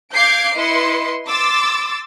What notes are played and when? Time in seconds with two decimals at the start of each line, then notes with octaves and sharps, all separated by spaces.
0.14 F5 D6 G6 G#6 C7 D7
0.55 E4 B4 D#5 C6 C#7
1.27 C6 D6 E6 A6